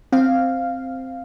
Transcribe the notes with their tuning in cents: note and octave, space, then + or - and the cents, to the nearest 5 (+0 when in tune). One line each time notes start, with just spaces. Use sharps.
C4 +0 F5 +0